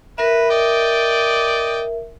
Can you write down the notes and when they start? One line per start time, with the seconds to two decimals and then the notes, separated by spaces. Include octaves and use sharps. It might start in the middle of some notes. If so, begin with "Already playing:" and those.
0.18 A#4 B4 E5
0.50 D5 D#5 G5